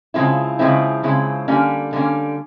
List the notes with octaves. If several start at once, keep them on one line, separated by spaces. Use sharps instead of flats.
C#3 F3 G#3 C4 E4
C#3 F3 G#3 C4 E4
C#3 F3 G#3 C4 E4
D3 G3 A#3 C#4
D3 G3 A#3 C#4